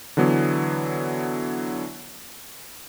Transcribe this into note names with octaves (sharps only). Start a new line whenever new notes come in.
D3 E3 F#3 B3